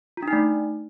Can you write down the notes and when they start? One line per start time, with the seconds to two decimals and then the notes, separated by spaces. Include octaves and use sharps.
0.17 F4
0.22 D4
0.28 D#4
0.33 A3